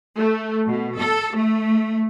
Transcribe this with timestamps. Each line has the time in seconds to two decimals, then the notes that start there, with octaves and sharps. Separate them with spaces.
0.16 A3
0.69 B2
0.98 A4
1.37 A3